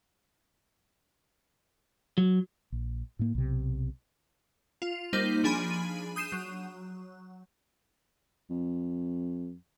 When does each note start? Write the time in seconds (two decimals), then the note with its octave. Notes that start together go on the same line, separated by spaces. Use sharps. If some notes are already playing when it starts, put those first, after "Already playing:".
2.18 F#3
2.72 A#1
3.19 A2 A#3
3.35 B1 C3
4.82 F4
5.13 G3 A#3 D#4 C5 B6
5.44 F3 D4 G#4 G#5 B5 D#7
6.16 D#6 G6 C7 D#7 E7
6.32 F#3
8.50 F2